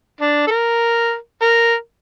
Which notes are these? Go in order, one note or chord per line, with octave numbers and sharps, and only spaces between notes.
D4
A4
A#4
A#4